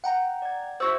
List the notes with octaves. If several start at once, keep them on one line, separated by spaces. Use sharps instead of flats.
F#5 G5 A#5
D5 G#6
E4 F#4 C5 E6